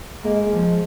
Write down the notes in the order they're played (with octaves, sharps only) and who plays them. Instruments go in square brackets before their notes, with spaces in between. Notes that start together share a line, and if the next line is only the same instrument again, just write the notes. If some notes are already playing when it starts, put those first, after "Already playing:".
[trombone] G#3 [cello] A#3
[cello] F3